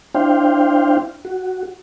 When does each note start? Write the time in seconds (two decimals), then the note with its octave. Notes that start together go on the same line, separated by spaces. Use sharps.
0.15 D4 E4 C5 F5 G5
1.25 F#4